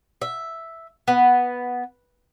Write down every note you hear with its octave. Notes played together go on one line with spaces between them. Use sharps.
E5
B3